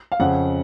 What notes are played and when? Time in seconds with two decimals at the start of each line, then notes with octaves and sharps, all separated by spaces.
0.12 F5
0.20 F2 C#3 F#5